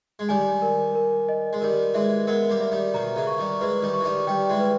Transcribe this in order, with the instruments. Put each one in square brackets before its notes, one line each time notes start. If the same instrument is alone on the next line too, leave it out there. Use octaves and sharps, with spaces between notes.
[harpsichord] G#3
[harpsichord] D#3 G3 [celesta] G#5
[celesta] A#4
A#4
D#5
[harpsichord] G#3
[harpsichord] D#3 G3 [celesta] A#4
[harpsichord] E3 G#3 [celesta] E5
[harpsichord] G#3 B3 [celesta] A#4
[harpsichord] G3 A#3
[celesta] E5
[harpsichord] D#3 G3
[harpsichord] B2 D#3 [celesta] A#5
[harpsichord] C#3 E3
[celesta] C#6
[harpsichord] D#3 G3
[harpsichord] E3 G#3 [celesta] B4
[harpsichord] D#3 G3
[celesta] C#6
[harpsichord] E3
D#3 G3
[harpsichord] D#3 G3 [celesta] G5
[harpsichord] E3 G#3
[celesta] B4